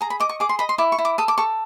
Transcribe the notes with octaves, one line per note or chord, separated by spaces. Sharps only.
G#4 A#5
B5
D#5 D6
C#6
G#4 D6
C6
D#5 B5
C6
E4 D6
C#6
E4
D6
A4 D#6
D6
A4 C#6